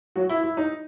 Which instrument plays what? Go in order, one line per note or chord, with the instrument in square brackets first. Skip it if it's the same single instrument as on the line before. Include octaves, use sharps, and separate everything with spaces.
[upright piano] F#3 F#4
E4
E4
D#4